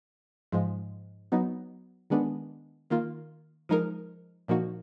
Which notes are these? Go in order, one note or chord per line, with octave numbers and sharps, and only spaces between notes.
G#2 F3 G#3
F#3 B3 D#4
D#3 G#3 B3 D4
D#3 A#3 F4
F3 G#3 D#4 A#4
A#2 F3 A#3 D#4 F#4